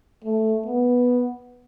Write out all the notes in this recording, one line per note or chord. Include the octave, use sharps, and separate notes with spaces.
A3
B3